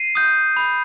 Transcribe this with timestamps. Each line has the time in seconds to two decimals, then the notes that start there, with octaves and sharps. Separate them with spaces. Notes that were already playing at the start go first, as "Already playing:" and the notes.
Already playing: C7 D#7
0.15 D#6 G6
0.57 B5